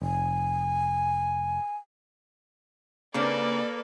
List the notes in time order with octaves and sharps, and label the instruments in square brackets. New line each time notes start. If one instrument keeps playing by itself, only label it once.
[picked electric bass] F1 [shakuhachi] G#5
[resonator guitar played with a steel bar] C#3 C4 D4 [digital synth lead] A#3 [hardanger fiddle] A4 B4 [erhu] D5